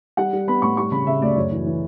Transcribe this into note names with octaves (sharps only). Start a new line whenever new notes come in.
G3 F#5
G3
B3 B5
A2 C#6
G3 C#6
C#3 B5
C#3 E5
D2 D5
F#2 C#5
E3
E3